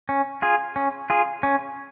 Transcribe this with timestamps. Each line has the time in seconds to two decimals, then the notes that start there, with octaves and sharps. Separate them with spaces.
0.09 C#4
0.42 F4 G#4
0.76 C#4
1.10 F4 G#4
1.43 C#4